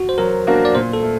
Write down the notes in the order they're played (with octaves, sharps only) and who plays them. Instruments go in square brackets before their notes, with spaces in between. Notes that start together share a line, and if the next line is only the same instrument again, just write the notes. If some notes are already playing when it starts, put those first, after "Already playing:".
Already playing: [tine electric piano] F#4
C5
[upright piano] F#3 [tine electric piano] A#4
[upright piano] A#3 D4 F#4
[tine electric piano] D5
[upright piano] A#2 [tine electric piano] C5
[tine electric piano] A4
[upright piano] A3